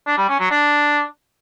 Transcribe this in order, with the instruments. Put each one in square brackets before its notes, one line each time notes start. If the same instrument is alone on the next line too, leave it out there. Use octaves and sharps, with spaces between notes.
[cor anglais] D4
G3
C#4
F#3
D4